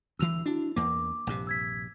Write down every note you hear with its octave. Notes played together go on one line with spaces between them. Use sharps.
D2 E3 E6 F7
D4 E4 F#4
E2 A#3 D6
A#1 G2 C3
E6 G#6 B6